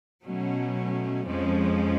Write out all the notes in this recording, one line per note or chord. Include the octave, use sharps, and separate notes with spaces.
B2 F#3 A3 C#4
F2 F3 G#3 C#4